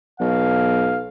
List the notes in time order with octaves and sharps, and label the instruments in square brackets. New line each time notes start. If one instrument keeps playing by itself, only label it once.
[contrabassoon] B1 [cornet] F5